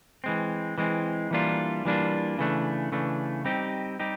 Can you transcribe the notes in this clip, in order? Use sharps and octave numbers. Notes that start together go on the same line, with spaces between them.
E3 G#3 C4
E3 G#3 C4
E3 G3 A#3 D4 F4
E3 G3 A#3 D4 F4
C#3 E3 A3 D4
C#3 E3 A3 D4
G3 C4 D#4 G4
G3 C4 D#4 G4